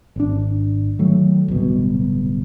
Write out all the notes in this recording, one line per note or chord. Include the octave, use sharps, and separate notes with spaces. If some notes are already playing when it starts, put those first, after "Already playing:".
G#1 D4
D#3 F#3 A3
D1 C2 B2